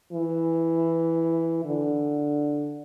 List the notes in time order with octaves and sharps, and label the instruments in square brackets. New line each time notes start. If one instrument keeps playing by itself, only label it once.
[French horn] E3
D3